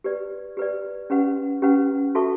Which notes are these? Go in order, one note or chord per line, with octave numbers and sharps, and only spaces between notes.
G4 B4 D5
G4 B4 D5
C#4 G4 B4 F#5
C#4 G4 B4 F#5
F#4 A4 E5 A5 C#6